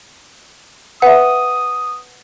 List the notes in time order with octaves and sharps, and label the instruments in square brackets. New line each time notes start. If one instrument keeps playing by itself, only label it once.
[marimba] B4 E5 [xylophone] F#5 [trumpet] D#6